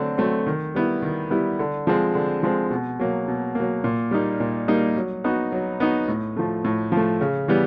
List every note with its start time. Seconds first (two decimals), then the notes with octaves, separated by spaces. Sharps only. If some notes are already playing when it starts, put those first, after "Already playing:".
Already playing: D3 F#3 A3 C4
0.18 F#3 A3 C4
0.47 D#3
0.75 G3 B3 E4
1.02 D#3
1.30 G3 B3 E4
1.59 D3
1.87 F3 G#3 C4
2.15 D3
2.43 F3 G#3 C4
2.70 B2
3.00 F#3 A#3
3.28 B2
3.55 F#3 A#3
3.84 A#2
4.11 G3 A#3 D#4
4.40 A#2
4.68 G3 A#3 D#4
4.96 F#3
5.24 B3 D#4 F#4
5.52 F#3
5.80 B3 D#4 F#4
6.08 A2
6.37 F3 A3
6.64 A2
6.92 F3
6.97 A3
7.21 C#3
7.48 E3 G3 B3